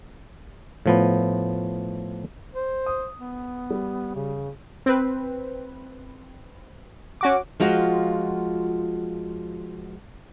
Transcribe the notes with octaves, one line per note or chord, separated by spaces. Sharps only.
A2 F3 B3
C5
D#6
B3
G3
C#3
C4 B4
C#4 F#4 D6
F3 G#3 F4 F#4